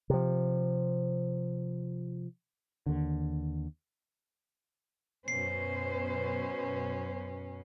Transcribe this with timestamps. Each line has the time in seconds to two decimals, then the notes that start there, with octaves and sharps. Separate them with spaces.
0.10 C3 F3
2.86 D#2 D3
5.28 F#2 B2 C#4 B4 C5 C7